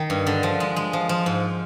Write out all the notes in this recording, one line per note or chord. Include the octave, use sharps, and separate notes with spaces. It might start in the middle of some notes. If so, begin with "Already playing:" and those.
Already playing: D#3
G2
D3
F3
G#3
G#3
F3
F3
G#2